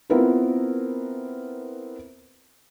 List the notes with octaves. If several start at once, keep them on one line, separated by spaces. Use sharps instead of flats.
B3 C4 E4 F4 A#4 B4